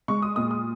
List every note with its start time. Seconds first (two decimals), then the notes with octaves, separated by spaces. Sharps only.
0.08 G#3 C#6
0.22 D#6
0.36 A#2 D#6
0.51 D#6